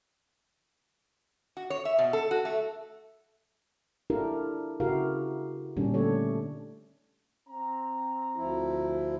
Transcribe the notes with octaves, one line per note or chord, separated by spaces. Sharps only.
F#4
C#5
E5
B2
A4
F#4
A3
D4 E4 F4 G4 A4 A#4
C#3 E4 F#4 G4 A#4 F5
A#2 D3 G3 C#4 D4
A3 C#4 G4 A4 C#5
C4 A#5
D2 F3 E4